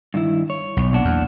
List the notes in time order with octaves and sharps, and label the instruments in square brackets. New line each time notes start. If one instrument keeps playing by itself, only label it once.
[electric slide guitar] G2 D#3 E4
C#5
[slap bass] B1
[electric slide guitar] A#2 D4 F#5
[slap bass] E2